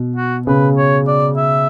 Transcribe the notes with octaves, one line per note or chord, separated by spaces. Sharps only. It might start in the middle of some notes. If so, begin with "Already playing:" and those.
Already playing: B2
F#4
C#3 B4
C#5
D5
E5